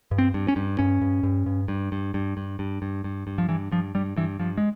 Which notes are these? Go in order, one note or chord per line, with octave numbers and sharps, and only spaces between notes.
G2
C4
G2
C#4
G2
G2 C#4
G2
G2
G2
G2
G2
G2
G2
G2
G2
G2
G2
F3
G2 E3
G2 F3
G2 G3
G2 E3
G2 F3
G#3